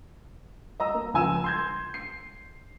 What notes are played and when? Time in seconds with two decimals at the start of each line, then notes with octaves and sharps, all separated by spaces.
0.80 D#5 A#5 E6
0.94 A#3
1.14 C#2 F3 G#5 E6 E7
1.44 C6 G6 G#6
1.94 C7